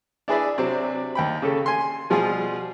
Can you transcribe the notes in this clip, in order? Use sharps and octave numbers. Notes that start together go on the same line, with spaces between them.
D4 E4 G#4 B4 D5 E5
C3 F#3 C4 D4
D#2 G5 B5
C#3 G4 A4
G#5 C6
B2 F3 G3 F4 G#4